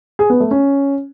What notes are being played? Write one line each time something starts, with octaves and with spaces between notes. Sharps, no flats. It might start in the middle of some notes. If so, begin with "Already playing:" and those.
G#4
B3
A3
C#4